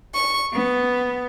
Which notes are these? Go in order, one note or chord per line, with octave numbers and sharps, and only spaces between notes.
C#6
B3